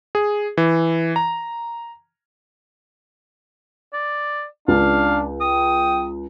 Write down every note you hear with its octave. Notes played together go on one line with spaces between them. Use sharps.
G#4
E3
A#5
D5
C#2 D4 F5
G5 D#6